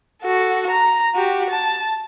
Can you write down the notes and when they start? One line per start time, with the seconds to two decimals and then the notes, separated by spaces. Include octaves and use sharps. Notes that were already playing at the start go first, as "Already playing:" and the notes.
0.23 F#4 A4
0.70 A#5
1.15 F#4 G4
1.50 A5